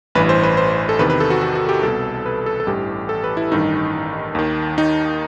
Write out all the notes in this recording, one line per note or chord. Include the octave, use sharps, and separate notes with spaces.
A1 G2 E3 B4
C5
B4
C5
A4
E2 C3 D#3 B4
B4
A4
F#4
F#4
F#4
G4
C2 B2 A4
B4
A4
A4
A1 G2 E3 G4
A4
B4
E4
A1 G2 D#3 D#4
D#2 D#3
D#4